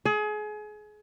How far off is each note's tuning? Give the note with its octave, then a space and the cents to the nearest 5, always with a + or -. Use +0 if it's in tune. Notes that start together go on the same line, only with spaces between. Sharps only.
G#4 +30